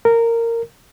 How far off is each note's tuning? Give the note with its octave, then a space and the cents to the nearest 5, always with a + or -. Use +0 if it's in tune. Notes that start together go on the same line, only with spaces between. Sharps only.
A#4 -15